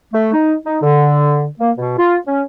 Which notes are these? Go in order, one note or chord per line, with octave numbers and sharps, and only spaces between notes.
A3
D#4
D#4
D3
A#3
B2
F4
C#4